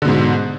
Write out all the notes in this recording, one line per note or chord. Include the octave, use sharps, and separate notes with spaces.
G#2 B2 D3